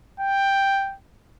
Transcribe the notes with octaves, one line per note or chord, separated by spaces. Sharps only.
G5